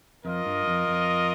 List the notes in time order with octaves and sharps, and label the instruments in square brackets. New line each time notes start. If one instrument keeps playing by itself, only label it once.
[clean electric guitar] F2 [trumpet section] F4 A#4 D#5
[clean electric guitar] G2
F2
F2